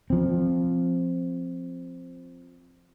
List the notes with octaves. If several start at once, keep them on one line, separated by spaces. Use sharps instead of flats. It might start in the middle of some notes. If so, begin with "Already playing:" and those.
F3 C4